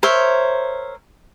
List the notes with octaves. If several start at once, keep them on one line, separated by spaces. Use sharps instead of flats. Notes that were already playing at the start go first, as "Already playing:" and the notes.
A#4 C5 C#5 E5